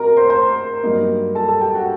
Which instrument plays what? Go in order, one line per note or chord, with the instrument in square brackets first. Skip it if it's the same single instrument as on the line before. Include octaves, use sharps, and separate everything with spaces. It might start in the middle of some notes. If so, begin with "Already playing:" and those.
Already playing: [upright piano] D#2 A3 C4 F#4 A#4 D#5 A#5
C5 C6
C5 C6
G2 F#3 A#3 D#4
A4 A5
A4 A5
G4 G5
F#4 F#5